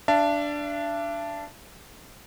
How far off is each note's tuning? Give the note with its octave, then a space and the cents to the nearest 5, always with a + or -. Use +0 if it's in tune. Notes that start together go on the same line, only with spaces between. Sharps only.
D4 -5 E5 +45 A5 +0